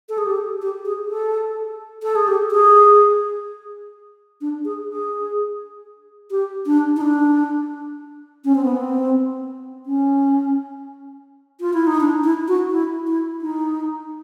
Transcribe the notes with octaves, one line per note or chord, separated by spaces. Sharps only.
A4
G#4
G4
G4
G#4
A4
A4
G#4
G4
G#4
D4
G#4
G#4
G4
D4
D#4
D4
C#4
C4
B3
C4
C#4
F4
E4
D#4
D4
E4
F#4
E4
E4
D#4